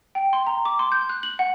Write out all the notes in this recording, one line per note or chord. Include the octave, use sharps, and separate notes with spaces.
G5
C6
A#5
D6
C6
G6
F#6
F#7
F#5